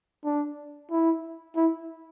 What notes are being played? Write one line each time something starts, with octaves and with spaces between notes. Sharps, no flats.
D4
E4
E4